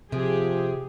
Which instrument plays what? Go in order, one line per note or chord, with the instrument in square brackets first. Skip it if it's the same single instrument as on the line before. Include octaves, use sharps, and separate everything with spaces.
[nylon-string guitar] C3 [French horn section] F3 [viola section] G4 G#4